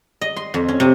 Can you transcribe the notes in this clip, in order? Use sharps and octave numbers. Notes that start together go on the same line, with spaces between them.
D#5
C6
F2
C#4
C3